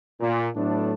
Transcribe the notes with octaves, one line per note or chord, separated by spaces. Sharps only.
A#2
A2 F#3 A3 B3 D4